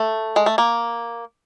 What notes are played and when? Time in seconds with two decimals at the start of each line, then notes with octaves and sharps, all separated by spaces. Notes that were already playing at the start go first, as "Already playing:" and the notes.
Already playing: A3
0.36 G#3
0.46 A3
0.58 A#3